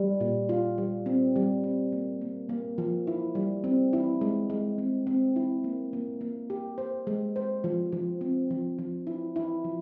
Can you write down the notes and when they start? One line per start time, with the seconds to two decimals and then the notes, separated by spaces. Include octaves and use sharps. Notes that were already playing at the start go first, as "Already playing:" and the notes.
Already playing: G3
0.20 A#2
0.49 F4
0.78 G3
1.06 C4
1.36 G3
1.64 C4
1.93 A#3
2.21 A#3
2.49 A#3
2.78 F3
3.07 E4
3.35 G3
3.64 C4
3.93 E4
4.21 G#3
4.50 G#3
4.78 C4
5.07 C4
5.36 E4
5.64 A#3
5.93 A#3
6.21 A#3
6.50 G4
6.78 C5
7.07 G#3
7.36 C5
7.64 F3
7.92 F3
8.21 C4
8.50 F3
8.79 F3
9.07 E4
9.36 E4
9.64 F3